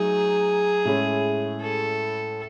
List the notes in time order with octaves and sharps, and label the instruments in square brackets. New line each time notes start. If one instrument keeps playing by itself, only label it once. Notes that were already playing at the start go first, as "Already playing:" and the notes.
Already playing: [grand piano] F#3 A3 D#4 [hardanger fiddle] G#4
[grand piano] A2 G#3 C#4 E4
[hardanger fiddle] A4